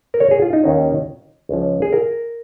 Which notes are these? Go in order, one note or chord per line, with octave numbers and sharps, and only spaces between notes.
A#4
C#5
G#4
F4
D#4
D#2 D#3 C#4
C#2 C#3 F3
G#4
A#4